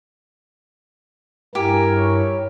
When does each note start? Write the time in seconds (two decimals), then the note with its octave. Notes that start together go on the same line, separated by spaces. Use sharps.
1.55 G2 E4 G4 A#4 G#5
1.96 C#5